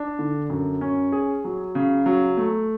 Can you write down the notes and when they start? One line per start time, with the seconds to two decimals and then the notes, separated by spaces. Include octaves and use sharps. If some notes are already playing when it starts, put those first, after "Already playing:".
Already playing: D4
0.19 D3
0.50 F#2
0.81 C#4
1.12 G#4
1.44 F#3
1.75 C#3
2.06 F#3
2.37 A3